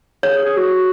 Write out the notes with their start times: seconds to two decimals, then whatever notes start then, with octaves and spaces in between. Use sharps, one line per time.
0.23 G#4 C#5
0.34 G#4
0.45 G#4
0.57 F#4